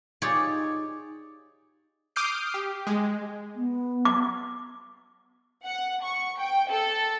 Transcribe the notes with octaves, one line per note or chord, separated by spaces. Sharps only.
D#4 F4 G4 G#4 C#5 D5
D6 D#6 F6 G6 C7 D7
G4
G#3
B3
D6
F#5
C#6
G5
A4